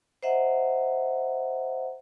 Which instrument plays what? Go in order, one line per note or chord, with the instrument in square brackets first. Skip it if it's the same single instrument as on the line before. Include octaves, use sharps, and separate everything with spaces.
[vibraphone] C5 D#5 E5 F#5 A#5